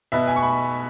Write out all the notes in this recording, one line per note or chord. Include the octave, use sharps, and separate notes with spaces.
B2 B3 E5
G#5
C#6
B5